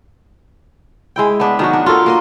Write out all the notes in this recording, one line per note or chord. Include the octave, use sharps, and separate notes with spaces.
G#3 E4 G5
B3 D4
D#3 F#3 F#4
D4
F4 F#4 A4 A#4
A#3 A#4 D#5